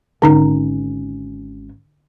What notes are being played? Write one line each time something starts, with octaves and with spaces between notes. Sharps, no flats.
G#1 D3 C#4 D#4 A#5